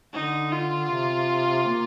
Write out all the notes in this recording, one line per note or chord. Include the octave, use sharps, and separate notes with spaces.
D3 D#4
F4
C3
A#3